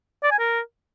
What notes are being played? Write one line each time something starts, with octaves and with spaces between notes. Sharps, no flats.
D5
G#5
A#4